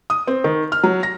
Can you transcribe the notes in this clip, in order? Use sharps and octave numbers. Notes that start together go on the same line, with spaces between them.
D#6
C4
D#3
F6
F#3
A#6